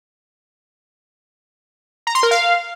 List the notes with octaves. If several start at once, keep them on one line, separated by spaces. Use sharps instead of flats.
A#5
C6
A#4
F5